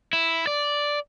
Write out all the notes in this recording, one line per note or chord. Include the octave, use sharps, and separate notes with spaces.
E4
D5